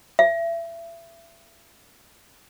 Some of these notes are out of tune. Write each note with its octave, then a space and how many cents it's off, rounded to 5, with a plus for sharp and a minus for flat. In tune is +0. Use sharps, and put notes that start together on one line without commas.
E5 +30